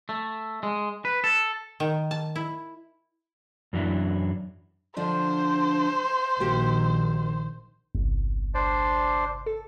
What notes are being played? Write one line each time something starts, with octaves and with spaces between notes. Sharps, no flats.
A3
G#3
B4
A4
D#3
A5
E4
F#2 E3 F#3 D4 E4
D3 F3 D4 C5
A#1 D#3 A#3 F#4 G4
G1 C2
D4 C5 D5
A4